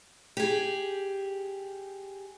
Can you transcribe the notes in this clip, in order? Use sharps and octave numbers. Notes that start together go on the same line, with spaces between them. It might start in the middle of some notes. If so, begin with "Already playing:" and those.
G4 G#4